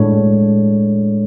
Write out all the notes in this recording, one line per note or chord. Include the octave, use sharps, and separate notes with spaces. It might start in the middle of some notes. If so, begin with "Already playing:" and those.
Already playing: A2 G#3 D4 A4 C#5